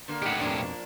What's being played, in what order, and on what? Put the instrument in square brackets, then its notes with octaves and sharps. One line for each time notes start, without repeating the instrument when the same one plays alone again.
[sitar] D3 A#3
[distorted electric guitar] A2 G4 [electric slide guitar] D#4 F#5
[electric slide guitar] F2 B2 [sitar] F3 A#3 D4